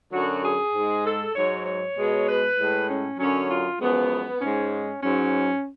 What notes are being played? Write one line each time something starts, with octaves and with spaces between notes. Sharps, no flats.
F#2 D3 F#3 F#4
G#4
G#2 G#3
A4
G#2 F#3 C#5
C#5
B2 G#3
B4
A2 G#3
C#4
F#2 D3 F#3 C#4
F4
F#2 F3 G#3 B3
G#2 G#3 C#4
G#2 F#3 C#4